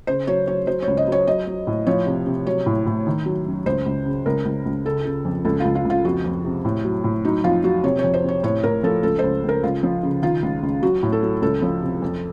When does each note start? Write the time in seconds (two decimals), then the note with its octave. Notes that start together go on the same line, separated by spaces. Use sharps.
0.07 C#3 C5
0.27 F#3 C#5
0.47 F#3 C#5
0.67 F#3 C5
0.82 C#5
0.87 C#2
0.97 D#5
1.07 F#3 C#5
1.27 F#3 D#5
1.47 F#3
1.67 A2
1.87 F3 C#5
2.07 C3
2.27 C3
2.47 F#3 C#5
2.66 A2
2.87 A2
3.07 D#3
3.26 F#3
3.46 F#2
3.66 C#2 C5
3.86 C#2
4.06 C#3
4.26 C#2 A#4
4.45 C#2
4.65 C#2
4.85 C#3 A4
5.05 C#3
5.25 F2
5.45 C#2 A4
5.60 C#2 F4
5.75 F4
5.85 C#2
5.90 F4
6.05 F2 F#4
6.24 F2
6.45 C3
6.65 A2
6.85 F#3
7.04 A2
7.25 F#3 D#4
7.44 F2 F4
7.64 F#3 F#4
7.84 C3 C#5
7.99 C#5
8.04 F2
8.14 C5
8.24 C3 C#5
8.43 A2 C#5
8.63 A2 A#4
8.83 F3 A4
9.03 C#2 A4
9.19 C#2 C5
9.44 C#2
9.49 A#4
9.63 C#2 F4
9.83 F3
10.03 C#3
10.22 D#3 F4
10.43 C#2
10.63 C#2
10.82 F#3 F#4
11.03 A2
11.12 A4
11.22 F#3
11.42 C#2 A4
11.62 F3
11.82 C3
12.02 F2